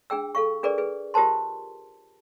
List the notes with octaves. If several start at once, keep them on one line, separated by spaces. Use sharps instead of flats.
D4 G#4 G5 E6
A4 F5 C#6
D4 G#4 A#4 B4 D5
G#4 B4
F4 G4 A#4 C5 A5 C6